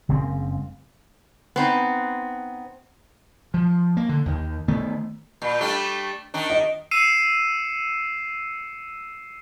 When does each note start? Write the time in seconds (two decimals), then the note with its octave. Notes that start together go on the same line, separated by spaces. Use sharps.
0.09 F#1 C#3 G#3 C4
1.56 B3 C4 D#4
3.54 F3
3.97 A#3
4.09 D3
4.26 D#2 D#3
4.68 D#3 A3 B3
5.42 A#2
5.61 G3 A3 D4
6.34 D#3 D4
6.50 D#5
6.91 E6 C7 C#7 D#7 E7